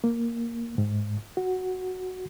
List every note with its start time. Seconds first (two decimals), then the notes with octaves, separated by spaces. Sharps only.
0.04 A#3
0.78 G#2
1.37 F#4